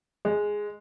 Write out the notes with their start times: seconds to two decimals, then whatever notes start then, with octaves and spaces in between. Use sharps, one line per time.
0.25 G#3